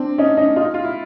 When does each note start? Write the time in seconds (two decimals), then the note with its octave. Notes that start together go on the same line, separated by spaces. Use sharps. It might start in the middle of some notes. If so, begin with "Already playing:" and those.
Already playing: C4 D4
0.18 C#4 D#4
0.37 C#4 D#4
0.56 D#4 F4
0.74 F4
0.84 E4